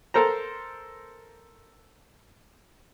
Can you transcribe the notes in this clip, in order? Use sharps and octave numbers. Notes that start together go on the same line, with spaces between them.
A4 A#4 C5 A#5